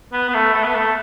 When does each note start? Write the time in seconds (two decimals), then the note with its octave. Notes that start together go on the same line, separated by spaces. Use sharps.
0.13 B3
0.29 B3
0.34 A3
0.54 A3
0.64 B3
0.75 A3